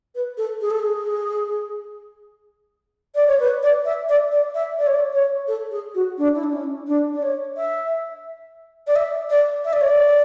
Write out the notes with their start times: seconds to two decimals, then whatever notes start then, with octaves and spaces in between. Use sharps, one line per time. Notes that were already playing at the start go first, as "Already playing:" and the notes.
0.15 B4
0.37 A4
0.61 G#4
0.71 A4
0.79 G#4
3.15 D5
3.27 C#5
3.40 B4
3.63 D5
3.85 E5
4.09 D5
4.32 D5
4.55 E5
4.79 D5
4.87 C#5
4.95 D5
5.13 C#5
5.48 A4
5.71 G#4
5.95 F#4
6.18 D4
6.35 E4
6.44 D4
6.53 C#4
6.87 D4
7.14 D5
7.22 C#5
7.56 E5
8.87 D5
8.96 E5
9.30 D5
9.65 E5
9.73 D5
9.81 C#5
9.88 D5